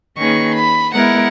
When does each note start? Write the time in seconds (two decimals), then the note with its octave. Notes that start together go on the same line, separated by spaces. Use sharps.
0.18 D#3 A#3 C#4 G#4 B4 C#6
0.55 B5
0.94 G#3 B3 E4 A#4 F#5